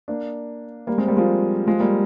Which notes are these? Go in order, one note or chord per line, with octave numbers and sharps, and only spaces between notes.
A#3 D4
G3 A#3
G#3 C4
G3 A#3
F3 G#3
F3 G#3
G3 A#3